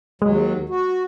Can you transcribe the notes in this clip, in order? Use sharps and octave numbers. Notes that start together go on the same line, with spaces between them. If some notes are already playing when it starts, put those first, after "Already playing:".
D#2 F#3 G#3
F#4